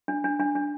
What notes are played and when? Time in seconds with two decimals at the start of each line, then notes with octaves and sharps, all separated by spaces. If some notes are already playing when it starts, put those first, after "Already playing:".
0.08 D4
0.24 D4
0.40 D4
0.55 D4